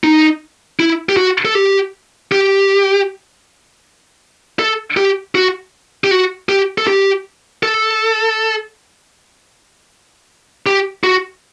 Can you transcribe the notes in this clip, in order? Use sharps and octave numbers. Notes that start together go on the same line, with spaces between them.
D#4
E4
G4
F#4
A4
G4
G4
A4
G4
F#4
G4
F#4
G4
A4
G4
A4
G4
F#4